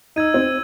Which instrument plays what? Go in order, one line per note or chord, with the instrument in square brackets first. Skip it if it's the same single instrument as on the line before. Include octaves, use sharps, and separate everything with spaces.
[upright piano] D#4 [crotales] E6 G#6 D#7
[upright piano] C4